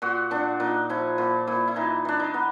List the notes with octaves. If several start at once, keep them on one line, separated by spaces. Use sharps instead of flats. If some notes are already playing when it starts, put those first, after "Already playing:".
A#2 F#4
A#2 D4
A#2 D#4
F3 E4
A#2 F4
A#2 E4
E4
E3 D#4
E3 D4
D#4
B3